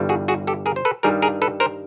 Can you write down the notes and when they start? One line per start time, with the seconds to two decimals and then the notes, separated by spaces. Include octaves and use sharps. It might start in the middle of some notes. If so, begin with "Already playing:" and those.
Already playing: G1 G2 E3 G3
0.09 F#4 G#4
0.28 F#4 G#4
0.47 G4 A4
0.66 G#4 A#4
0.76 C5
0.85 A4 B4
1.03 G2 D#3 G3 G#4 A#4
1.22 G#4 A#4
1.42 A4 B4
1.60 A#4 C5